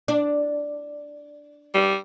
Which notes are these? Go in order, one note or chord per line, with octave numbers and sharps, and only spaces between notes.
D4
G3